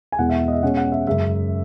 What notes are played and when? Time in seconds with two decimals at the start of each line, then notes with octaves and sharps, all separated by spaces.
0.12 G#5
0.18 E2 B2 G#3 F#5
0.29 E5
0.48 D#5
0.52 E5
0.62 B2 G#3 C#4 F#5
0.77 F#5
0.92 E5
1.07 F#2 C#3 G#3 E5